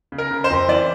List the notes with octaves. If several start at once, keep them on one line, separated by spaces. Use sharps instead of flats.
C#3
A#4
C#3
C5
F2
E3 D5